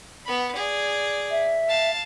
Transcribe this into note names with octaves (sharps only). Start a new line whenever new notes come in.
B3 B5
G#4 D5
E5
F5 A5